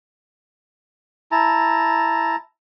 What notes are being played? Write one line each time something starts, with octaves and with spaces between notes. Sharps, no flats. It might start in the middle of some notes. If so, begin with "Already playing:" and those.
E4 A5 A#5